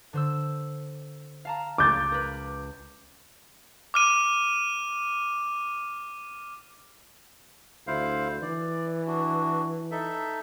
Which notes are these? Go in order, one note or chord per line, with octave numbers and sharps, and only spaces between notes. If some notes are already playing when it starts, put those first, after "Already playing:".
D3 C5 E6
F5 A5 A#5
C#2 D6 G6 A6
A#4 B4
D6 F6 D#7
D2 E4 C5 F5
E3 D5
D4 F#4
D#4 A4 E5